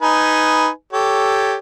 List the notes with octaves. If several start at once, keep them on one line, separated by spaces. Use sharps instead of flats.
D#4 B4 G#5
G4 A4 C#5